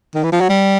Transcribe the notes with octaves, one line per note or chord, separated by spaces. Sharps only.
D#3
E3
F3
F#3
G3